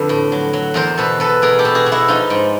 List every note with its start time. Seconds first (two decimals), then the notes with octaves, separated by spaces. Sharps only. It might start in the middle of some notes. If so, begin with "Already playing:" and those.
Already playing: F2 D3 A4 B4
0.09 A2
0.32 F#3
0.53 F#3
0.74 E2 A#4 C5
0.97 B2 A4 B4
1.20 E2 A4 B4
1.42 B2 G#4 A#4
1.59 G4 A4
1.65 B2
1.75 F#4 G#4
1.86 B2
1.92 E4 F#4
2.08 F3 D#4 F4
2.30 G#2